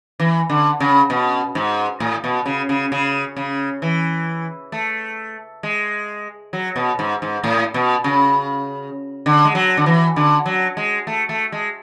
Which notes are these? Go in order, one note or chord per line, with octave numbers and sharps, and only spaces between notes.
E3
D3
C#3
B2
G#2
A2
B2
C#3
C#3
C#3
C#3
E3
A3
G#3
F#3
B2
G#2
G#2
A2
B2
C#3
D3
G#3
F#3
D3
E3
D3
F#3
G#3
A3
A3
G#3